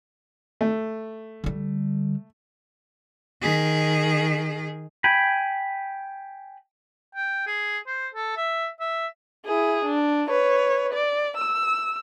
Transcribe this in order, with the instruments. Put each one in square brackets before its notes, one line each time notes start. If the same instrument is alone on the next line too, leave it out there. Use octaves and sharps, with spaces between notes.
[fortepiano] A3
[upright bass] D3 G3
[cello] D#3 G#4
[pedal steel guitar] G5 G#5 B5
[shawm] G5
G#4
C5
A4
E5
E5
[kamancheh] E4 G#4
D4
B4 C#5
D5
E6